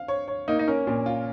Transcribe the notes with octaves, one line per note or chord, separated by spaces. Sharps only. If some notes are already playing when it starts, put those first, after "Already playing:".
Already playing: F5
C#5
C#5
A#3 D#4
D#4
C#4 A#4
A#2
F4